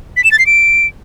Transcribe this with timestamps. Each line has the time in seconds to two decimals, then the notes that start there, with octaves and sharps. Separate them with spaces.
0.17 B6
0.24 E7
0.32 A6
0.39 C7
0.46 D7